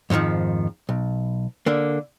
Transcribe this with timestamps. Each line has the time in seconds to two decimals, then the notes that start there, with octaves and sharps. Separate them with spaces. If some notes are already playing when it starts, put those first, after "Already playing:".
0.10 F2 G#2 C3 D#3 F3
0.89 B1
1.66 D3 A#3